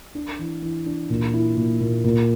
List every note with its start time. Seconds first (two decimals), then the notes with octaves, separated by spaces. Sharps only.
0.15 D4
0.39 E3
0.62 E3
0.86 D4
1.10 A#2
1.33 E4
1.57 A#2
1.81 A#2
2.04 A#2